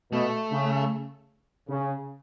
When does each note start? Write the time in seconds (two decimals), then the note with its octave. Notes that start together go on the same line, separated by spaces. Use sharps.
0.12 B2 A3
0.52 C#3
1.69 C#3